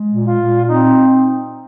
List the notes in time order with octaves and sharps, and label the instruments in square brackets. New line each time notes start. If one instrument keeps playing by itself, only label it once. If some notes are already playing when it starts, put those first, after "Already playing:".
Already playing: [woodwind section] G#3
A#2
[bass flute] F4
[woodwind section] A#2
[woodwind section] C4 [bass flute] D#4